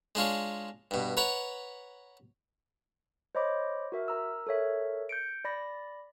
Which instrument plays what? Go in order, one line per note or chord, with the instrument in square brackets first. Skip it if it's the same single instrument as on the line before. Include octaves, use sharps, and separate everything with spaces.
[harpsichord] G#3 D4 F4 C#5
G2 B2
B4 C#5 F#5 A#5 B5
[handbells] C5 C#5 D#5 B5 D6
F#4 A#4 E5
A#4 A#5 E6
A4 A#4 C#5 E5
G6 C#7 D7
D5 B5 A#6